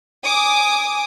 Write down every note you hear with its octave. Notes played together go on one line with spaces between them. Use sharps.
G#5 D6 D#6